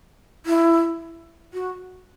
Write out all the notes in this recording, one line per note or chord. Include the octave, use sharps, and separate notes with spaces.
E4
F#4